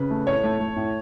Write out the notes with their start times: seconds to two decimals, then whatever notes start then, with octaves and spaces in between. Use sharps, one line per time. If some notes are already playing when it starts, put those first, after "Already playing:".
Already playing: C#3 B4
0.10 A3
0.27 A2 C#5
0.43 A3
0.60 A3
0.76 A2